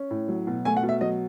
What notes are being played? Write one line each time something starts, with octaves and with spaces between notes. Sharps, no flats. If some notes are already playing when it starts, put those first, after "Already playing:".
Already playing: C#4
A2
F#3
B2
A3 G#5
F#5
B2
E5
F#3 D#5